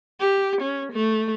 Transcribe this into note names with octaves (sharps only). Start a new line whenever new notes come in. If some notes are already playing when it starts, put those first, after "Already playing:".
G4
C#4
A3